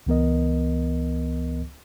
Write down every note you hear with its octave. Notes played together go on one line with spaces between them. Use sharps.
C#2 E3 B3 A#4 D#5